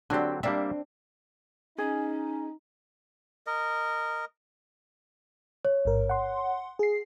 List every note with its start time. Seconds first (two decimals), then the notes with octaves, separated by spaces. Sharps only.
0.10 D3 F#3 C4 D4 G4
0.43 G3 A#3 C4 D4 E5
1.78 C#4 D#4 G#4
3.47 A#4 D#5
5.65 C#5
5.85 A1 G#2 A#4
6.09 F#5 C6
6.79 G#4 C7